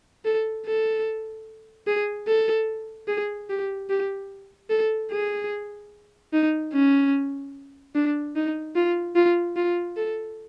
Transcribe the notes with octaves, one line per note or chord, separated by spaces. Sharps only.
A4
A4
G#4
A4
G#4
G4
G4
A4
G#4
D#4
C#4
D4
D#4
F4
F4
F4
A4